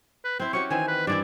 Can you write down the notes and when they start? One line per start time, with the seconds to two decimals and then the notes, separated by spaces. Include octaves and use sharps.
0.25 B4
0.40 C4 E4 C5
0.53 C#4 F#4 G4 C#6
0.70 D#3 E3 C4 G#5
0.88 B4
1.07 G2 E3 E4 D5